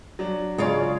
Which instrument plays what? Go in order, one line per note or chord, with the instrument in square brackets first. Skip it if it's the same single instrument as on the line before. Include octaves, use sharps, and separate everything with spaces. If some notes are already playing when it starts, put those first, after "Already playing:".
[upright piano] F#3 D4
[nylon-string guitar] C#3 F4 D5 [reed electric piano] G#3 [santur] G#4 C#5